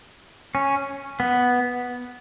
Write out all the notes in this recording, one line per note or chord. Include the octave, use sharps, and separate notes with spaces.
C#4
B3